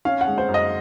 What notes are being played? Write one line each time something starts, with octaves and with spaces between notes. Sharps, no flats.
C#4 F5
F#5
G#3
C5
F#2
D#5